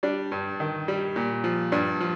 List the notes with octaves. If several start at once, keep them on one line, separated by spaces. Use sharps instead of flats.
G3 D4
G2
D#3
G3
A#2
F3
G2 D4
F3